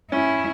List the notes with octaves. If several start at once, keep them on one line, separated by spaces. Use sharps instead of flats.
C#4 E4